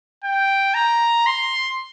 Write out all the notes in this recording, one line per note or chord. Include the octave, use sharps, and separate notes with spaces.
G5
A#5
C6